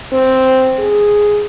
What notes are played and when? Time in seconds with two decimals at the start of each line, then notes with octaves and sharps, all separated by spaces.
0.13 C4
0.79 G#4